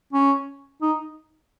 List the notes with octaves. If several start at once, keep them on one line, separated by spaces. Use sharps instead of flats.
C#4
D#4